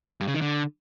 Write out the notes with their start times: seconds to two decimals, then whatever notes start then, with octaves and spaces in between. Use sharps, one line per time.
0.21 G2
0.28 C#3
0.35 D#3
0.41 D3